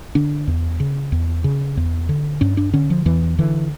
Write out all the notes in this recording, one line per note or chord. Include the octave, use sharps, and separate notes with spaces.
D3 D4
E2
C#3
E2
C#3
E2
D3
G2 C#4
D4
D3 C#4
F3
E2 E3
D3 E3